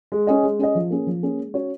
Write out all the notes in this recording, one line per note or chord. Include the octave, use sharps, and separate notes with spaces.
G#3
C#4 G#4 D#5
G#3
C#4 G#4 D#5
F3
A#3 C#4 G#4
F3
A#3 C#4 G#4
G#3
C#4 F#4 C#5